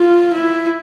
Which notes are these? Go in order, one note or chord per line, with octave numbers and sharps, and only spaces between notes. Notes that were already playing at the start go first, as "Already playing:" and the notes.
Already playing: F4
E4